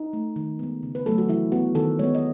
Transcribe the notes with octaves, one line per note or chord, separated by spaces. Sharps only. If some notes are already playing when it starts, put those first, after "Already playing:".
Already playing: D#4
A3
D#3
G#3 B3
C#3
B4
F#3 A3 A4
F#4
E3 E4
B3 F#4
D#3 A4
G#3 B3 C#5
D#5